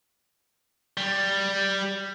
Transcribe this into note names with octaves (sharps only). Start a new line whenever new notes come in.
G3